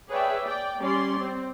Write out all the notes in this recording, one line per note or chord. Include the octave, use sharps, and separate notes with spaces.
G#4 B4 C#5 D5 E5 G5
D5 G5
G3 C#4 C#5 D5 C6
C4